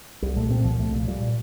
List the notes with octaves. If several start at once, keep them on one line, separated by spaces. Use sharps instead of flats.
C2 G3
A#2 A3
A#2 C4
C2 F3
C2 A3
A#2
A#2 G3